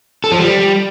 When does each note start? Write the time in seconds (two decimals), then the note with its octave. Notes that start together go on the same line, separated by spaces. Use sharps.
0.24 A4
0.32 F3
0.40 G3